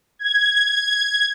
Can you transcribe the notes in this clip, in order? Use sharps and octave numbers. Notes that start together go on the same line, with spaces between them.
G#6